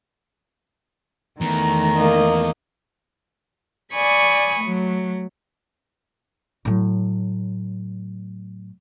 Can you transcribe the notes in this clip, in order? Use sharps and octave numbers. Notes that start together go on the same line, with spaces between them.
E2 D#3 A3 A#5
A#3 D#5
D5 G#5 B5 C#6 D#6
F#3 A3
A2 F#3